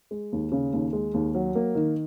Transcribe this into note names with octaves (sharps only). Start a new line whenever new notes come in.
G#3
D#2
C#3
D#2
G#3
D#2
F#3
A#3
D#3